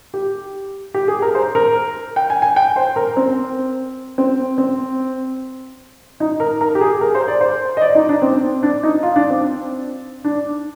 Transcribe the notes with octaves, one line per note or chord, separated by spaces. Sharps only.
G4
G4
G#4
A#4
C5
A#4
G5
G#5
G#5
G5
C5
A#4
C4
C4
C4
D#4
A#4
A#4
G4
G#4
A#4
C5
D5
C5
D#5
D5
D#4
D4
C4
D4
D#4
F4
D4
C4
D4